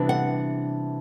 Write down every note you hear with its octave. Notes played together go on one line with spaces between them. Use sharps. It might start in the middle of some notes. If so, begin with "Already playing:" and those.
Already playing: C3 E3 G3 B3 D4
F#5